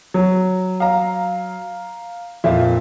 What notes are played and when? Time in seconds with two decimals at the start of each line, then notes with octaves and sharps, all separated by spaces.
0.14 F#3
0.80 F5 A#5
2.44 F2 A#2 E4 F4